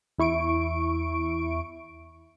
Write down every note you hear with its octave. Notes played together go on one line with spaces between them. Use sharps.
E2 E4 C#6 D7